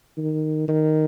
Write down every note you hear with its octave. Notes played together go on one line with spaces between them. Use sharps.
D#3
D#3